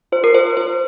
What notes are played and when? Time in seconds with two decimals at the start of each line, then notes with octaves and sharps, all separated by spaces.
0.12 F4 C5
0.24 A#4
0.35 F4 C5
0.57 F4 C5